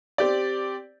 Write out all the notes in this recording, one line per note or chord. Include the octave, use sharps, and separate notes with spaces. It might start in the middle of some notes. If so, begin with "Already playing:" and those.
C4 G4 D5